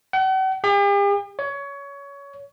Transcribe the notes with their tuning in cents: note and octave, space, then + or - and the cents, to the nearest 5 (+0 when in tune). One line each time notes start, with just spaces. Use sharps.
F#5 +45
G4 +45
C#5 +20